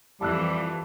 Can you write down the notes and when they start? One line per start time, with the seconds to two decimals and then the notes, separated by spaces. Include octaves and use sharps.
0.21 F2 E3 G3 A5 E6 F#6